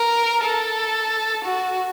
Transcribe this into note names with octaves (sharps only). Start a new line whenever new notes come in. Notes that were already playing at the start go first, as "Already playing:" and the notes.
Already playing: A#4
A4
F#4